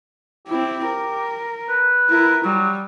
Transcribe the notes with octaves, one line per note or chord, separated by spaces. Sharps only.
C4 E4 G4
A#4
B4
E4 A#4
F#3 G3